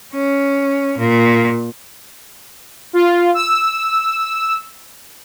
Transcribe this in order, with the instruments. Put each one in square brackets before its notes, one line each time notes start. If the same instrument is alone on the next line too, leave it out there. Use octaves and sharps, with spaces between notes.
[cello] C#4
A#2
[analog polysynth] F4
E6